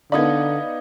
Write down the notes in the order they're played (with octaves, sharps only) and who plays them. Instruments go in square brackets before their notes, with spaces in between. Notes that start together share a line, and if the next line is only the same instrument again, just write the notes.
[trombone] D3 [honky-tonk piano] B3 D#4 D5 [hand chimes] F5 D#6 G#6